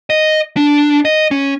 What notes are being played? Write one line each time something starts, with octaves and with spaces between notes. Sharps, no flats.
D#5
D4
D#5
C#4